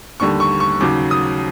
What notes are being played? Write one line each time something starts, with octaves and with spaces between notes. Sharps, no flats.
D#2 D3 G3 C#6
C#6
C#6
D#2 C#3 F#3 D6
D#6